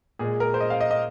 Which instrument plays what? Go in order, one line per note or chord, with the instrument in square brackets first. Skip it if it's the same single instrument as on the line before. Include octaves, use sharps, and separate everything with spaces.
[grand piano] A#2 G#3 G#4
A#4
C5
D#5
F5
D#5
D#5